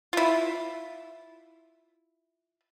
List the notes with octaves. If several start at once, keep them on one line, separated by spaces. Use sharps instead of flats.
E4 F4